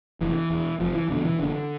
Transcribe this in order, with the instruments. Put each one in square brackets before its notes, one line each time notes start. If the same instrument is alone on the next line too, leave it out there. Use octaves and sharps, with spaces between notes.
[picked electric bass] F1 E3
E2 B2
F1 F3
E3
E2 B2 D3
E3
F1 D3